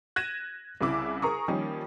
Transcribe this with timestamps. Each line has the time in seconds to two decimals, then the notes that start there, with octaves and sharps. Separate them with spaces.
0.16 F#6 G#6 A#6 D#7 E7
0.81 C2 C#3 E4 D6
1.22 G#4 A#4 A#5 C#6 D#6
1.48 D#3 F3 G3 A#3 C#4